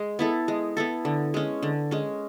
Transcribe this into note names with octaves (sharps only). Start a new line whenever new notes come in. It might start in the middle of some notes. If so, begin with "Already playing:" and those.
Already playing: G#3
B3 E4 A4
G#3
B3 E4 A4
D3
G#3 C#4
D3
G#3 C#4